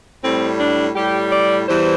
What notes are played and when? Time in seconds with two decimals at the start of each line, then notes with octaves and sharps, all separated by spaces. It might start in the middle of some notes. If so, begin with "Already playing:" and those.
0.23 A2 G3 C4
0.60 D4
0.96 A2 G3 G4
1.32 D5
1.68 E2 E3 G3 C5